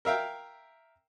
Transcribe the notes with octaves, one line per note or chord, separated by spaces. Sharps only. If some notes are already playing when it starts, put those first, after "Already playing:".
A#4 E5 F5 G5